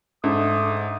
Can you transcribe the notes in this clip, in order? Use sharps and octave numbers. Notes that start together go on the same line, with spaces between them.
G#2 A3 D4 D#6